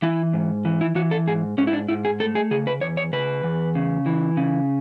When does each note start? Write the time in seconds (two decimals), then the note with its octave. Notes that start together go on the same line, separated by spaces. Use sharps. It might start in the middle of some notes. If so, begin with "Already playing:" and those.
0.02 E3 E4
0.33 G#2
0.65 E3
0.81 E4
0.95 E3 F#4
1.11 A4
1.27 G#2 G#4
1.58 G#2 C#4
1.67 E4
1.73 D4
1.88 G#2 E4
2.05 G#4
2.20 A3 A4
2.35 G#4
2.51 C#3 G#4
2.67 B4
2.81 E2 C#5
2.97 C#5
3.13 C#3 B4
3.43 E2
3.75 C#3
4.06 E3
4.37 C#3